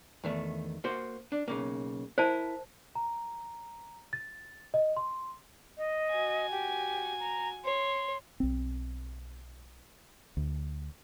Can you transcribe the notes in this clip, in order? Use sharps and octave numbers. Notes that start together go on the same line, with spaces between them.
E2 D#3 A3
A#3 F#4 C5
D4
B1 C#3 A#3
E4 A#4 C5 A5
A#5
A6
D#5
C6
D#5
F#4 G#5
G4
A#5
C#5 C6
B1 C4
D2